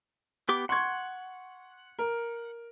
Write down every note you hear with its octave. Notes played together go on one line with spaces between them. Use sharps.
B3 G4 D6
F#5 C6 C#6 G#6
A#4